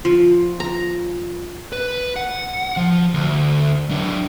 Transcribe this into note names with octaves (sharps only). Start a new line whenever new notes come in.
F3
A#5
B4
F#5
F3
D2
F#3 D4